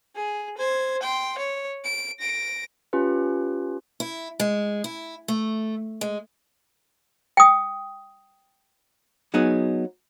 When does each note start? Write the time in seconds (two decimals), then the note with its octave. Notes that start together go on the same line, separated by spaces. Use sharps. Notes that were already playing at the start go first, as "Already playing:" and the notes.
0.15 G#4
0.57 C5 G#6
1.02 G5 C6
1.38 C#5
1.84 D7
2.20 A#6 D7
2.93 C#4 F4 G4 B4
4.00 E4
4.40 G#3
4.84 E4
5.28 A3
6.01 G#3
7.37 G5 D#6
9.34 F#3 B3 D#4 G#4